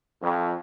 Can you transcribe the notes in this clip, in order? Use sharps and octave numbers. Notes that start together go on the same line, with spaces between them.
F2